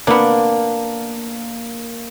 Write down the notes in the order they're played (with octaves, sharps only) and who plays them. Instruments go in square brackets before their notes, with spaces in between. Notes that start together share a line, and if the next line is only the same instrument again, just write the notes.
[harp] A#3 [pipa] B3 D4